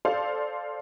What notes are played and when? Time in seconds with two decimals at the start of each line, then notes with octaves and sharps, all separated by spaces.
0.05 A4 C5 D5 F5